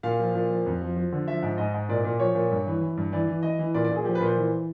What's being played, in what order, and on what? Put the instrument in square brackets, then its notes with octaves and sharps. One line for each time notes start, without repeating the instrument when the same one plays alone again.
[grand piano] A#2 F5
F3
A#2
F3
F2
F3
F3
D3
F3 E5
G#2
G#2 D#5
G#2
A#2 D5
A#2
F3 C#5
A#2
G2
E3
E3
G2
E3 D5
E3
E3 D#5
E3
A#2 D5
D5
A#2
G#4
F3 G4
B4
A#2
C5
E3